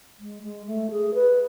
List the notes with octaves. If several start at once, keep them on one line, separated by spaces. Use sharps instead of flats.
G#3
G#3
A3
G#4
B4